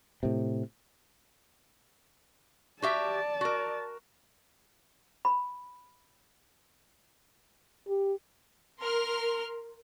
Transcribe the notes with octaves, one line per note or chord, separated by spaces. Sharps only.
A2 C3
F#4 G4 D5 E5 A5
F#4 A#4
B5
G4
A#4 C6 F6